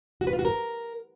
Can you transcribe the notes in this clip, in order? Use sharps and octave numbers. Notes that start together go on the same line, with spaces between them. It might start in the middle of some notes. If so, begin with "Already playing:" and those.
F#4
B4
F4
F#4
A#4